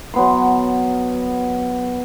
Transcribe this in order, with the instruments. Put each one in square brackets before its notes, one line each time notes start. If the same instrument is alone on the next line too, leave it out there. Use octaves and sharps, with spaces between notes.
[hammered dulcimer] F#3 B3 C6